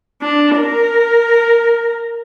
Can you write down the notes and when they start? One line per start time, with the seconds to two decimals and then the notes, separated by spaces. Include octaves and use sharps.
0.22 D4
0.56 A#4